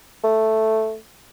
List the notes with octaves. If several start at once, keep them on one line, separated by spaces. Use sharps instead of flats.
A3